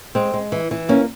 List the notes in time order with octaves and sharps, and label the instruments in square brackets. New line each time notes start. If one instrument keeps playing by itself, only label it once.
[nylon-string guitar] G#3 C4
G#3
E3
E3
A#3 C#4